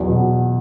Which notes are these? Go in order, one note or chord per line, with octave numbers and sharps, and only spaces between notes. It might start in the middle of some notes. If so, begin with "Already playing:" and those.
Already playing: E2 F#3
B2